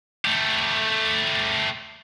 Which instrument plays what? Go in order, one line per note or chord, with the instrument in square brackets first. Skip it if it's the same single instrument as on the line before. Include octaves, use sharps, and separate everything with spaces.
[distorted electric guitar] A3 G4